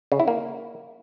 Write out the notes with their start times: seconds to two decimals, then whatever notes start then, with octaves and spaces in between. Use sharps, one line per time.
0.12 C#3
0.20 E4
0.28 A#3